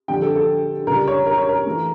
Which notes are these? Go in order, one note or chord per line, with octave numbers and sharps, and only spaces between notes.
F2 D3 G3 G5
A4
A4
C#2 C#3 G3 A#4
C#5
A#4
C#5
A#4
E3 A3